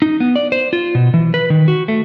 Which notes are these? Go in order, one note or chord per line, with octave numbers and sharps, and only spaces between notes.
D#4
B3
D5
C5
F4
B2
E3
B4
D#3
F#4
A3